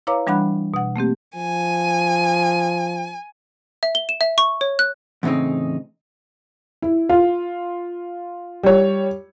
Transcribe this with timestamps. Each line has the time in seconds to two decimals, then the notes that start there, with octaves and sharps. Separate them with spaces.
0.07 E4 B4 C#5 F5 A#5 D6
0.27 E3 G3 D4 F#5 B5 F#6
0.74 B2 F#5
0.96 A3 A#3 C4 G4
1.36 F3 G#5
3.83 E5
3.95 G7
4.09 E7
4.21 E5
4.38 C#6
4.61 C#5
4.79 F#6
5.23 E2 A2 C#3 C4 D#4
6.82 E4
7.09 F4 F5
8.63 G3 C#5